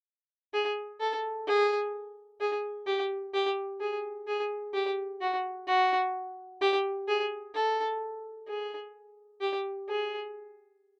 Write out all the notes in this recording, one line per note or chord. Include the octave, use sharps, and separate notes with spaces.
G#4
A4
G#4
G#4
G4
G4
G#4
G#4
G4
F#4
F#4
G4
G#4
A4
G#4
G4
G#4